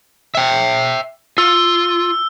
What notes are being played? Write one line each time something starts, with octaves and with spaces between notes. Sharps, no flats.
E5 G5
F4 E6